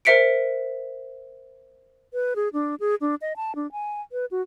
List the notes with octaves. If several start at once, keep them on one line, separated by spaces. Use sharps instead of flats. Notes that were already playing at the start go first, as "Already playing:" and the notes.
A#4 C5 E5 B6 C#7 D7
B4
G#4
D4
G#4
D4
D#5
A5
D4
G#5
B4
F#4